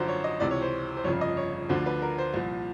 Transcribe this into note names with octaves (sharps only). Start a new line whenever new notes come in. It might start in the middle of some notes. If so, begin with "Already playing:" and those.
Already playing: G#1 F#2 D3 F3 C5
C#5
D#5
C#2 C3 E3 D5
C#5
C5
C5
G1 F2 C#3 F3 C#5
D#5
C#5
D2 D3 F3 C5
B4
A#4
C5
C2 A#2 F3